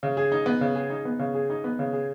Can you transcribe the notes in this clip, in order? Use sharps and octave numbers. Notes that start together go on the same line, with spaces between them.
C#3
G#4
D#4
B3
C#3
G#4
D#4
B3
C#3
G#4
D#4
B3
C#3
G#4